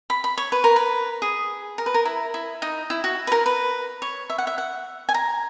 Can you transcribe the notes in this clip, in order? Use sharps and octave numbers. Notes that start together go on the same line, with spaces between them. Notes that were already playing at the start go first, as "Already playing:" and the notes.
B5
B5
C#5
B4
A#4
B4
G#4
A#4
B4
A#4
E4
E4
D#4
E4
F#4
B4
A#4
B4
C#5
E5
F#5
E5
F#5
G#5
A#5